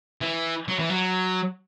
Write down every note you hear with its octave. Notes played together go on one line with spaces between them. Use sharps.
E3
F#3
E3
F#3